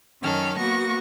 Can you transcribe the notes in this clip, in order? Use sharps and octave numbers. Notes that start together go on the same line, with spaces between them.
F#2 D#3 C#4 A4 F6
A#3 B3 F#4 C#6 A#6